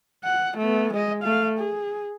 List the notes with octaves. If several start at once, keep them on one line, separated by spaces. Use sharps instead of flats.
F#5
A3 B3
G#3 D#5
A3 F5
G#4